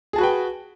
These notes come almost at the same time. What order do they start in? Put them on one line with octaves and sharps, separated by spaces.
G#4 A5 F#4 B4 G5